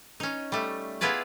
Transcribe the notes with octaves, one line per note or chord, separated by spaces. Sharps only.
C#4 D#4
G3 A3
B3 E4 F4 G#4 B4 D5